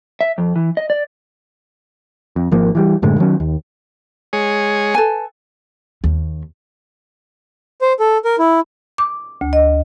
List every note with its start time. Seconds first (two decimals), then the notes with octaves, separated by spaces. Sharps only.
0.21 E5
0.38 F2
0.56 E3
0.77 D#5
0.90 D5
2.36 F2
2.51 G#1 F3 A#3
2.75 E3 F3 G3
3.02 F#2 A2 D3 G#3
3.18 D#3 F#3 C#4
3.40 D#2
4.33 G#3 G#4 C#5
4.94 A4 B4 G#5
6.04 D#2
7.81 C5
8.00 A4
8.25 A#4
8.39 E4
8.98 D6
9.41 D2
9.53 D#5